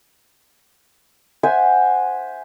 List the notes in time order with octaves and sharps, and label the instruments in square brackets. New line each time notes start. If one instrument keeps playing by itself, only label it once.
[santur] C5 E5 F#5 G#5